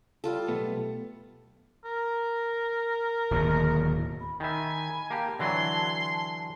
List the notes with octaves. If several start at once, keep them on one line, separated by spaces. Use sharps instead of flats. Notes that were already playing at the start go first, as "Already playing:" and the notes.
G3 F4 A4
B1 A3 B3
A#4
D1 D#2 B2
B5
D#3 E5 G#5 B5
A#3 G4 A5
D3 E3 F#3 C6